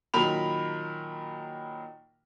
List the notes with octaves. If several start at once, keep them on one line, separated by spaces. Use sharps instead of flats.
A#2 D#3 F#3 A#4 B5 F7